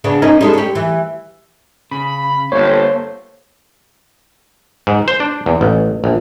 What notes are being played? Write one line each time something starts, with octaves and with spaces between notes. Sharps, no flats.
C#3 B3 D4
A#3 C#4 D#4
G3 G#3 A4
G4 C#5
E3
C#3 B5
G1 A#3 A4 C5 C#5
G#2
C5
D4
E2
A1
A#1